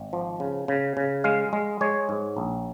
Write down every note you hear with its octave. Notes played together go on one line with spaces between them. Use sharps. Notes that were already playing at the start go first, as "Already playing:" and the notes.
Already playing: G#1
F3
C#3
C#3
C#3
G#3 F5
G#3
G#3 C#5
G#2
A#1